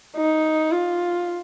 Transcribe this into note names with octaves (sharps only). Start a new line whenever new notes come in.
D#4
F4